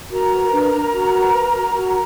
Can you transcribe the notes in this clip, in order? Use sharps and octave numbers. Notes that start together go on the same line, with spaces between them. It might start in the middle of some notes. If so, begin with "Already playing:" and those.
F#4 A#4 A#5
B4
D4
D4
F#4
B4
B4
F#4
F#4